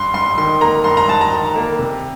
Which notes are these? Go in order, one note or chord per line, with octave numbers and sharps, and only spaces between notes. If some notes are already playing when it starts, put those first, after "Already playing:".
Already playing: G2 C6
G2 C6
D#3 C6
A#3 A#5
G2 C6
A#5
G2 A5
A#5
D#3
A#3
C3